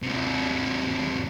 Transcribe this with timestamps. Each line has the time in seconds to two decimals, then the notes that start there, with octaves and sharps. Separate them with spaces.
0.02 D#2 C3